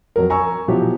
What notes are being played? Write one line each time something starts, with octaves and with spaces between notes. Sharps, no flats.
F2 F#3 A#4
G#5 A#5 C#6 E6
B2 F3 F#3 E4 G4